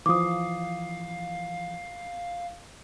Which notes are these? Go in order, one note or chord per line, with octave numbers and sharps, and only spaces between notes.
E3 F3 F5 D6 D#6